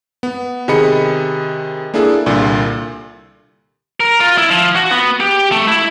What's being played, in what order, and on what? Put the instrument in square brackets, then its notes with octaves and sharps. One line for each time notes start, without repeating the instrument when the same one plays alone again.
[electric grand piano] B3
C3 D#3 G#4 D#5 B5 C#7
A#3 D4 E4 G#4 A4
C2 A#2 D3
[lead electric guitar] A#4
F4
E4
F3
F#4
B3
G4
A3
E4